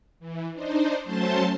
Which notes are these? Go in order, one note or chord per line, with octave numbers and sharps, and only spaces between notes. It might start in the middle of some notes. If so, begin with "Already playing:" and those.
E3
D4 D#4 C5
F#3 A3 C#4 C5 A5 C6